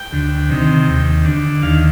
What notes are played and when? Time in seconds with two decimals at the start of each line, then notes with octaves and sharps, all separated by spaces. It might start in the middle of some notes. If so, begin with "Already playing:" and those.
Already playing: G5
0.13 D2
0.50 C3 D#3
0.87 D#2
1.25 D3
1.62 D#2 F5